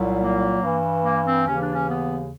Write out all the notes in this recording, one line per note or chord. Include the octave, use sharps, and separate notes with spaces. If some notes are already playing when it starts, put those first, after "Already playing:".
Already playing: C2 A#2 F#3
A#3
G2 E3
A#3
C4
D#2 C#3 E3 C#4
D4
C#4
B3